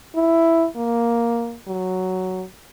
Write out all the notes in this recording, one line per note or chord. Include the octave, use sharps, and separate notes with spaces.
E4
A#3
F#3